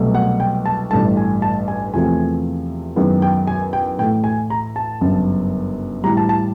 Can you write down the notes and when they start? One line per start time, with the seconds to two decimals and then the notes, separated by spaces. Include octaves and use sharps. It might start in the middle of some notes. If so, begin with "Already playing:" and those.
Already playing: C2 B2 F#3 A3
0.15 F#5
0.40 G5
0.66 A5
0.91 A1 G2 E3 A3 A5
1.17 G#5
1.42 A5
1.68 G#5
1.93 E2 C3 F3 A3 C4 G#5
2.96 F#2 D#3 G#3 B3 E4
3.22 G5
3.47 G#5
3.73 G5
3.99 A2 E3 A3 G5
4.24 G#5
4.50 A#5
4.76 A5
5.01 G1 F#2 C#3
6.04 A2 E3 G3 A#5
6.17 A5
6.29 A5